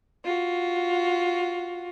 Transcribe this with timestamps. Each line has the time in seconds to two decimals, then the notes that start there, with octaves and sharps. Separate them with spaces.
0.24 F4 F#4